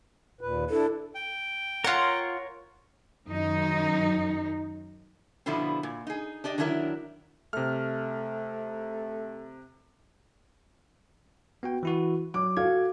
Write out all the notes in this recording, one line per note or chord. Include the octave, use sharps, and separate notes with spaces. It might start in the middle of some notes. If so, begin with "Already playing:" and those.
D#2 A#2 B4
D4 E4 A4
G5
F4 A#4 C#5 F#5 A#5
F#2 D#3 D#4
B2 D3 F3 B3 E4
A#2
D#4 G#4
D4 G4 D5 D#5
D#3 F#3 D4 E4 G#4 A#4
C3 A3 F6
B3 F#4 G5
E3 E4 F#4
F#3 D6
F#4 A4 F5 G#6